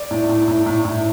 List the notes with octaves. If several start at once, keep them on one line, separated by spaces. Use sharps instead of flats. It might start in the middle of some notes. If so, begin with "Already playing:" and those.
Already playing: D5
A2
A2
A2
A2
A2